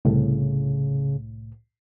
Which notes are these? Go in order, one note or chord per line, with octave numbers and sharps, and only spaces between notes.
C2 A2 C#3